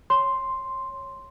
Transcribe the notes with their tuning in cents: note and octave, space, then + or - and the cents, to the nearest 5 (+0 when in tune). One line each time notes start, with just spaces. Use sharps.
C#5 -5 C6 +0